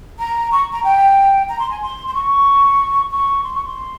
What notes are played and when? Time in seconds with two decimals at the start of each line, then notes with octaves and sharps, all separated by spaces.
0.19 A#5
0.52 C#6
0.72 A#5
0.84 G5
1.49 A#5
1.59 C6
1.71 G#5
1.82 C6
2.08 C6
2.14 C#6
3.11 C#6
3.44 C6
3.54 C#6
3.65 C6